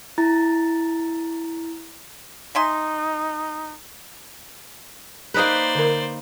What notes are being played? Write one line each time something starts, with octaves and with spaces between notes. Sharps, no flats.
E4 A#5 A6
D#4 E5 G#5 C6
A#3 D#4 B4 C5 D5
D3 A#4